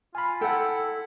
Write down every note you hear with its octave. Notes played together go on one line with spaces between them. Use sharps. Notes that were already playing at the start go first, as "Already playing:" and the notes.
F4 G#5 B5
E4 A4 F#5 G5